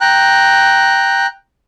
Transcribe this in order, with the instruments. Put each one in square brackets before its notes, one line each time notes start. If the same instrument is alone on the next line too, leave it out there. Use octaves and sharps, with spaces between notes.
[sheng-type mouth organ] G5 A#5 F#6